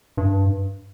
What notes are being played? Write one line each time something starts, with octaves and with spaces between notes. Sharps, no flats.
G2